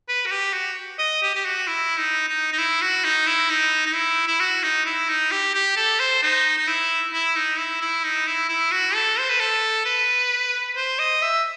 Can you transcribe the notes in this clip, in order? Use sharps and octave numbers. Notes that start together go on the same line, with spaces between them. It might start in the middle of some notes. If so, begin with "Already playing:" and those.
B4
F#4
G4
F#4
D#5
G4
G4
F#4
E4
D#4
D#4
D#4
E4
F#4
D#4
E4
D#4
D#4
E4
E4
F#4
D#4
E4
D#4
G4
G4
A4
C5
D#4
D#4
E4
E4
D#4
E4
E4
D#4
E4
E4
F#4
A4
C5
B4
A4
B4
C5
D#5
E5